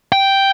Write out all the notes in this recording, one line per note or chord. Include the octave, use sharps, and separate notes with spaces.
G5